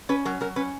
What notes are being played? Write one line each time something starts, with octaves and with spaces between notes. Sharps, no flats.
C#4 B4
F#3 A#4
F#3 A#4
C#4 B4